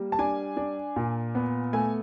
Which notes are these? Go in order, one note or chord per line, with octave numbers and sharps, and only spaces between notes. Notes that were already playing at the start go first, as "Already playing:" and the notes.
Already playing: G3 A#3
A5
D4 G#5
D4
A#2
B3
A3 G#5